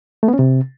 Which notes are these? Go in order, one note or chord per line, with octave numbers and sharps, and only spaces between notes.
A3
B3
C#4
C3